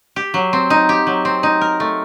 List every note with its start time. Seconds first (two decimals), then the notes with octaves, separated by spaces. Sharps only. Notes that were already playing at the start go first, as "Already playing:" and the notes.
0.16 G4
0.34 F#3
0.53 C4
0.70 D#4
0.89 G4
1.07 F#3
1.25 C4
1.43 D#4
1.61 A#4
1.80 A3